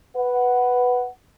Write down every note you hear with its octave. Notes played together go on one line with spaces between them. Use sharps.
B4 F#5